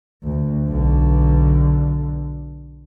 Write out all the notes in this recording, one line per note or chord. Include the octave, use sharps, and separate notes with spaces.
D2
B1 D3